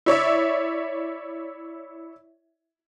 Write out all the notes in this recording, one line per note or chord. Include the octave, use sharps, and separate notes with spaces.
E4 C#5 D5 E5